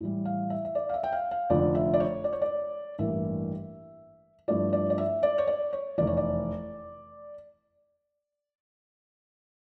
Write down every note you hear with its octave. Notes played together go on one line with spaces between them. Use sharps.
A2 E3 G3
F5
E5
E5
D5
F5
E5
G5
F5
F5
F1 F2 D3 F3 D5
E5
D5
C#5
D5
C#5
D5
A1 G2 E3 G3 A#3 E5
G2 F3 A3 E4 D5
D5
D5
E5
D5
C#5
D5
C#5
F1 E2 E3 D5
C#5
D5